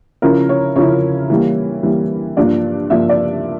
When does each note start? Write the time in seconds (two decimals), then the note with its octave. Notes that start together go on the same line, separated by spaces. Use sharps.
0.22 C#3 F3 C#4 E4 A#4
0.49 C#5
0.76 C#3 F3 C#4 E4 C#5
1.30 E3 G3 A#3
1.83 E3 G3 A#3
2.37 G2 F3 A#3 D4 D5
2.90 G2 F3 A#3 D4 E5
3.09 D5